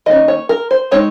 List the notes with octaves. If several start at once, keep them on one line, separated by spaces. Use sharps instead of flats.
D#3 A#3 C#4 D#5
C#5
A#4
C5
G#3 C4 D#4 C#5